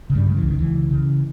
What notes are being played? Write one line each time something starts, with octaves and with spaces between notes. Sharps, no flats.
C#3
G2 G3
C#3 G3
E3
C#2
D#3
C#2 E3
C#3
C#3